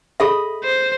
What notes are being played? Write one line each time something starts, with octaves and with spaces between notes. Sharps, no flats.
G#4 A4 D#5 E5 B5 D#6
C5